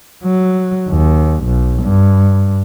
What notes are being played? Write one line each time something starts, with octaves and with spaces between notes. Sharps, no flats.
F#3
D#2
B1
G2